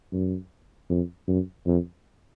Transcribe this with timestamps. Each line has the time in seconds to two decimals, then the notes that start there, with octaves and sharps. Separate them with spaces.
0.13 F#2
0.90 F2
1.28 F#2
1.67 F2